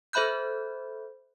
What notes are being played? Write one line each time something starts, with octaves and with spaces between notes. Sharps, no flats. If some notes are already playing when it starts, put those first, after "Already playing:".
A4 C5 E5 B5 F#6 G6